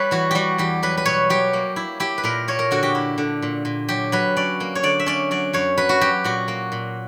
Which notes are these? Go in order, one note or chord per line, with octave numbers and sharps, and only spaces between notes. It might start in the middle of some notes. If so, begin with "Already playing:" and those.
Already playing: G3 B4 C#5
E3 F#4
G3 F#4 G4
E2 G4
F#3 B4
B4
B2 C#5
F#3 G4
A#3
E4
E4 G4
B4
A#2 A#4
A#3 C#5
A#4
D3 F#4
G4
E4
D3
A#2
A#2
F#3 G4
F#3 B4
C#4 D5
A#3
C#5
D3 D5
E5
C#4 D5
F#3 D5
F#2 C#5
F#3 B4
F#4
F#3 G4
A#2 F#4
A#3
A#2